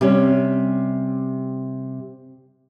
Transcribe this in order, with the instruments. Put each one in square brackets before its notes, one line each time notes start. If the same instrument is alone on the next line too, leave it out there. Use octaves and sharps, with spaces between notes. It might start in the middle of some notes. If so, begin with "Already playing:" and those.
[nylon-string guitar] C3 G3 C#4